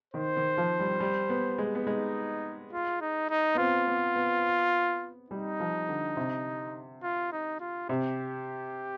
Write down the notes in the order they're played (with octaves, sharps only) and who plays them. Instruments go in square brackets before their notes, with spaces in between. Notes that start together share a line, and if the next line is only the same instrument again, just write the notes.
[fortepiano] D#3 [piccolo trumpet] C5
[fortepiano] D#3
F3
G3
G3
B3
G#3
B3
[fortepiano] G#3 [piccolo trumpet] D#4
[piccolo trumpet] F4
D#4
D#4
[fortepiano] B3
[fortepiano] C4 [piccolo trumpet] F4
[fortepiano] B3
B3
[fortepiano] G3 [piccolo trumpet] D#4
[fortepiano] F3
D3
C3
[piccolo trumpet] F4
D#4
F4
[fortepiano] C3 [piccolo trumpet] G4